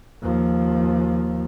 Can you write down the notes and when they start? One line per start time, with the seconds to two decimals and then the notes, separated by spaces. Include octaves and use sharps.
0.23 D#2 F3